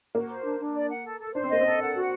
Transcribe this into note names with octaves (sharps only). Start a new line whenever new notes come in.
A#3 F#4
C5
D4
D4
D5
F#5
A4
A4
D4 C5
C4
A#3 D#5
C4 A4
F#5
F#4